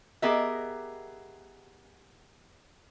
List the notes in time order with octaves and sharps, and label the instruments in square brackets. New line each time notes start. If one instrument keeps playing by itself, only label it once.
[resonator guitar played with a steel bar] B3 G4 G#4 A#4 D#5 E5